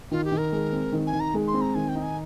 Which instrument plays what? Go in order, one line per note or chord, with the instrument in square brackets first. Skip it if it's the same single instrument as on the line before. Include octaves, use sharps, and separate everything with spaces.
[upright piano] D#3 [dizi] F4
[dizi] G4
[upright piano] D#3
[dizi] A#4
[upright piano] G#3
C4
D#3
[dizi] G#5
[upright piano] D#3
[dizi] A#5
[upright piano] G#3
[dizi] C6
[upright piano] C4
[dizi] A#5
[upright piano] D#3 [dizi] G#5
[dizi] G5
[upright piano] D#4
[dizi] G#5